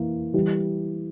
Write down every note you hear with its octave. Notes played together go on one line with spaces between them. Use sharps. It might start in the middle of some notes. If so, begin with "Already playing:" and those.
Already playing: E3 A#3
E3 G3